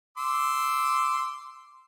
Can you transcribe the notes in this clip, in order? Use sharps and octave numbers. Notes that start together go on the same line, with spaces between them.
C6 D6 E6